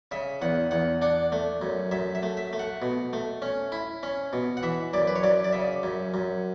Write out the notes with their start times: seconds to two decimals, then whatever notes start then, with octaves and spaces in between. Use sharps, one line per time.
0.11 C#3 E5
0.42 E2 F#5
0.71 E2 F#5
1.02 D4 F#5
1.32 A3
1.62 F#2
1.91 F#2 E5
2.15 E5
2.23 A3
2.37 E5
2.53 A3
2.59 F#5
2.82 B2
3.13 A3
3.42 C#4
3.72 E4
4.03 C#4
4.33 B2
4.57 F#5
4.63 E3 E5
4.93 F#2 D5
5.07 B4
5.16 C#5
5.23 F#2 D5
5.44 D5
5.53 C#3 E5
5.83 F#2
6.14 F#2